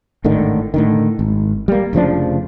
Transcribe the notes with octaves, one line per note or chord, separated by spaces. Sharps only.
G#1 A2 D3 D#3
A2 D3 D#3
G#1
G3 A#3
F1 C#3 F3 D4